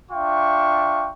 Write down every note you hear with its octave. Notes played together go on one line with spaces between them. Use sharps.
D4 F4 E5 G5 C#6